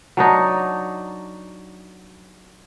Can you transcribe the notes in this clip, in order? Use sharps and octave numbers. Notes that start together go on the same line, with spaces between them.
F#3 D4 D#4